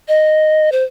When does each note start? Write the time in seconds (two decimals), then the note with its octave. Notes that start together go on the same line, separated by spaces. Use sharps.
0.08 D#5
0.72 C5